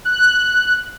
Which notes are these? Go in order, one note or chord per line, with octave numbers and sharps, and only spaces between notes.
F#6